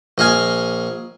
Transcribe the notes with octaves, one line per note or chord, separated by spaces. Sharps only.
A#1 D#5 F5 G#5